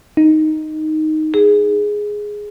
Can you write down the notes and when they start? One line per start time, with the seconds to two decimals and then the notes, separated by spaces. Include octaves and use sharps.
0.17 D#4
1.34 G#4